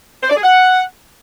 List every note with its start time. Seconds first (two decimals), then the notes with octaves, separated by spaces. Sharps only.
0.23 C5
0.29 D5
0.36 G#4
0.43 F#5